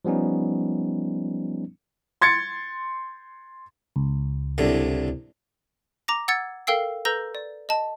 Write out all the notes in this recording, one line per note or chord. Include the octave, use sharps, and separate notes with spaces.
F3 G3 B3 C#4 D#4
C6 G#6 A6 C#7
C#2
C2 A2 D3
A#5 D6 A#6
F#5 E6 G#6 A6 C#7
A4 A#4 F5 G5 E6 C7
A4 B4 A#5 E6 G6 A#6
D5
D#5 A5